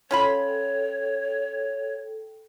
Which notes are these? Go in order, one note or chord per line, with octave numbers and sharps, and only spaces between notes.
C#4 F4 A4 C#5 G5 B5